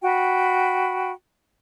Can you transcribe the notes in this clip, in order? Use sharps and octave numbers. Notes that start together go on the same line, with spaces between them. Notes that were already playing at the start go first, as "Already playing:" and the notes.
F#4 G5 B5